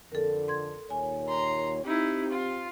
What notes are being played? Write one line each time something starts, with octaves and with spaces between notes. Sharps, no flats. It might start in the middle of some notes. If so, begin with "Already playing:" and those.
F2 D3 A4 A#4
C6 G#6
D#2 A#2 C#5 G#5
A#5 C6
C4 D#4 E4 G4
F4